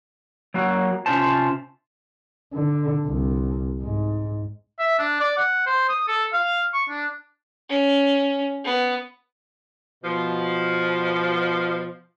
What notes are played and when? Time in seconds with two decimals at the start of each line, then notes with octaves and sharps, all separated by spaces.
0.54 F#3 A#3 F#4
1.06 C3 E3 C#4 F4 C5 A5
2.54 D3
3.06 C2
3.83 G#2
4.79 E5
4.99 D4
5.20 D5
5.37 F#5
5.67 C5
5.89 D#6
6.08 A4
6.33 F5
6.74 C#6
6.89 D4
7.69 C#4
8.65 B3
10.04 B2 F3